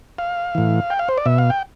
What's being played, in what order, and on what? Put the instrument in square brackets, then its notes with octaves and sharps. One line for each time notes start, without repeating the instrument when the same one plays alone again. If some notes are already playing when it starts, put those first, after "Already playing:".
[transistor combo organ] F5
A2 E3
G5
F5
C5
D5
B2 E5
F5
G5